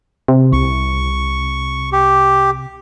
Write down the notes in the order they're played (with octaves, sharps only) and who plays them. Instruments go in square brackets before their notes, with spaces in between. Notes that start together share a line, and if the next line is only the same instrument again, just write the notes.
[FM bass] C3
[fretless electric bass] C2 [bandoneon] C#6
[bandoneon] G4